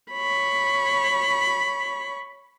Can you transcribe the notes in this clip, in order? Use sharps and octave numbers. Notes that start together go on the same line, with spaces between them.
C#5 B5